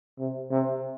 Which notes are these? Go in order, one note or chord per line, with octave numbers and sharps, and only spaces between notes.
C3
C3